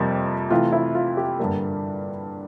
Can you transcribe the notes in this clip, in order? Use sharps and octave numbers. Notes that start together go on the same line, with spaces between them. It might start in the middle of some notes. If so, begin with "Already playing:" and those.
Already playing: F2 C3 G3 A#3
C3 E3 A3 F4
E4
F4
G4
G2 D3 G3 A#3